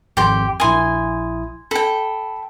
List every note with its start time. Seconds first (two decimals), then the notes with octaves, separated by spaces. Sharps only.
0.17 G#1 F2 G4 C6 G6
0.60 A#1 E4 G#5 C6 D#6
1.71 A4 G5 B5